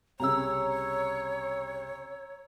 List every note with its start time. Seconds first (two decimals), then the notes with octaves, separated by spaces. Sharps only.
0.20 C2 C#3 C#5 A#5 E6